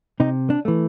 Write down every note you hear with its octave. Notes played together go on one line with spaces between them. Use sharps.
C3 D#4
D4
E3 A3